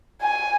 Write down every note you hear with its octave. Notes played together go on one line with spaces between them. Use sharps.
G#5